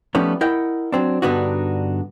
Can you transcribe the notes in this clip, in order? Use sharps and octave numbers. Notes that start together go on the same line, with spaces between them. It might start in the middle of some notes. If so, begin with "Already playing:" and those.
F3 G3 A3 B3 C#4 D#4
E4 A#4 D#5 F#5 G5
F#3 C4 D4
G2 D3 B3 D4 D#4 F#4